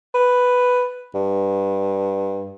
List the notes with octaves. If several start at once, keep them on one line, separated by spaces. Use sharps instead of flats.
B4
G2